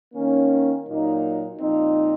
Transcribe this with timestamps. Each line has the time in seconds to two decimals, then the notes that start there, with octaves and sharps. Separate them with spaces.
0.13 D#3 A#3 C#4
0.87 A#2 F#3 A#3 D#4
1.60 A#2 F3 C4 D#4